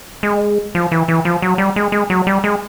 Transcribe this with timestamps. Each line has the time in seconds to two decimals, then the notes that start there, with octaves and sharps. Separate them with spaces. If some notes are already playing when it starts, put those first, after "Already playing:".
0.23 G#3
0.75 F3
0.92 E3
1.08 E3
1.25 F3
1.42 F#3
1.58 G3
1.76 G#3
1.92 G#3
2.10 F#3
2.27 G3
2.44 G#3